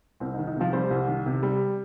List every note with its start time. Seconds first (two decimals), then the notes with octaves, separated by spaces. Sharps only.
0.20 C2 C4
0.34 D#4
0.39 D#3
0.47 D#4
0.56 C3 F3 F4
0.73 G3 C4 C5
0.91 C2
1.08 D#3
1.26 C3
1.43 G3